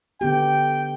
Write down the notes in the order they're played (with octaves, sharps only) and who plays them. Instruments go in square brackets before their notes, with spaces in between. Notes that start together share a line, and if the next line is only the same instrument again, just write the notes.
[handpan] D3 B3 G4 [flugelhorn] G5